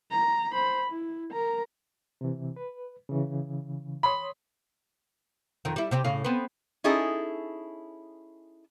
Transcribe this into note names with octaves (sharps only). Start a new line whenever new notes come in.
A#5
C5 B5
E4
A#4 A#5
C3 E3
B4
C#3 E3
C#5 B5 C6 D#6
F2 D#3
G3 E4
C3 C4 G4
A2 C#3 F5
B3 C4
C#4 D#4 E4 G#4 A4